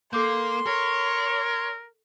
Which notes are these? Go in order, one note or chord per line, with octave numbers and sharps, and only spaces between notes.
A#3 A4 C6 D6 G6
A#4 C#5